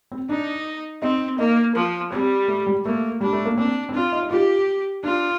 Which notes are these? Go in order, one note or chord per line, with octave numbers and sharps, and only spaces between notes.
C4
D4 D#4
C4 D#4
A#3 D#4
F3
G3 C4
A3
G3
A3 A#3
G3 D4
A3
A#3
C4 D4
C4
D4 F4
D#4
D#4
F4 G4
D4 F4